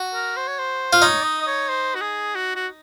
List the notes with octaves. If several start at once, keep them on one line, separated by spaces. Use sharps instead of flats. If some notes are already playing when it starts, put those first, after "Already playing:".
Already playing: F#4
A#4
C5
C#5
C5
F4
D#4 C#5
D#5
D#5
C#5
C5
F#4
G#4
F#4
F#4